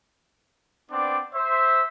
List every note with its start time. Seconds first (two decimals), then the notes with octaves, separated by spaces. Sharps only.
0.90 B3 C4 D4 D5
1.34 C5 E5